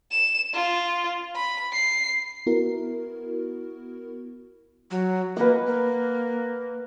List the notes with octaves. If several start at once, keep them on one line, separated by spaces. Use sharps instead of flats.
E7
F4
B5
C7
B3 E4 F#4 A#4
F#3
A#3 B4 F#5
A#3